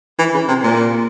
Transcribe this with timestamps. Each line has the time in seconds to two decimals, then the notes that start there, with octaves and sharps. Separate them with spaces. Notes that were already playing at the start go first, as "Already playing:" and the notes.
0.19 E3
0.34 C#3
0.48 C3
0.63 A#2